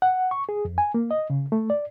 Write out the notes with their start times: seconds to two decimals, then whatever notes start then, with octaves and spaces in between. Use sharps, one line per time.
0.02 F#5
0.31 C#6
0.49 G#4
0.65 F2
0.78 G#5
0.94 A#3
1.11 D#5
1.30 C#3
1.52 A3
1.70 D5